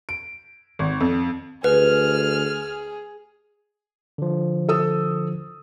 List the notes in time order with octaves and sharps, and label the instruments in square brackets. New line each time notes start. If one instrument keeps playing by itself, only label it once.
[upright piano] D7
G#1
F2
[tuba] D2 [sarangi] G#4 [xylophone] B4 [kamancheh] F6
[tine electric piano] D3 F3
[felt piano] A4 D#6 E6